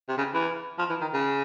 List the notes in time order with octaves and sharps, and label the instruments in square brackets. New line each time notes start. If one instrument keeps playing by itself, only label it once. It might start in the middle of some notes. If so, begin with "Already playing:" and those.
[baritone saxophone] C3
C#3
E3
F3
E3
D#3
C#3